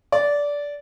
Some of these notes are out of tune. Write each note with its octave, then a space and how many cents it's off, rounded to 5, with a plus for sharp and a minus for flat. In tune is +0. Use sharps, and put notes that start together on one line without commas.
D5 -15